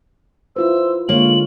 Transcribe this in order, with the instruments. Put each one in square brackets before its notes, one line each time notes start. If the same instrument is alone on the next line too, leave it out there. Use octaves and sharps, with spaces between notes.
[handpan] E4 F4 B4 [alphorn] C5 [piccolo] E6
[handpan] D3 G#3 C#5 [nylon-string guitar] A#3 [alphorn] F4 [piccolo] F#7